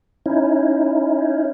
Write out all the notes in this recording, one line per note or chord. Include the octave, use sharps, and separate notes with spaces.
C#4 D#4 E4